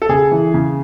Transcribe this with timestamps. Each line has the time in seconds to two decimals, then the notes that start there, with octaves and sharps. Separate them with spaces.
0.02 A4
0.09 C#3 G#4
0.32 E3
0.54 C#3